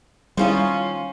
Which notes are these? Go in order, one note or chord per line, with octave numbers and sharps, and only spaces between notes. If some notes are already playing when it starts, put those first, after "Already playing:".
D#3 G3 C#4 E4 F4 G#4 C5 C6